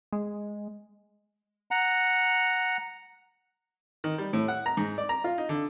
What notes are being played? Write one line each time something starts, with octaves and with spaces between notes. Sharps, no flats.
G#3
F#5 A#5
D#3
G3
A2
F#5
A#5
G#2
D5
A#5
F4
D#4
D3